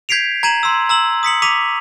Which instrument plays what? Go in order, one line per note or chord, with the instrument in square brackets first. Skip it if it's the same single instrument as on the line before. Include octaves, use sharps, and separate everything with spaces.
[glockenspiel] G6 G#6 B6 C7 D7 F7
A#5 G#6 D#7 E7 F#7
C6 E6
A#5 E6 F#7
D#6 B6 C#7 F#7
D6 B6 D#7 F7